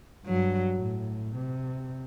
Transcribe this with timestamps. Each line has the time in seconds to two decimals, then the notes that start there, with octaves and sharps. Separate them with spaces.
0.26 G2 F#3
0.81 A2
1.35 C3